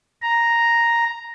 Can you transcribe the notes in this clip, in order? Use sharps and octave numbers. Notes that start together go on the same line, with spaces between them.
A#5